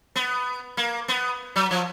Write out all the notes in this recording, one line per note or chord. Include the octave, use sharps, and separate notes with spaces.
B3
A#3
B3
F#3
F3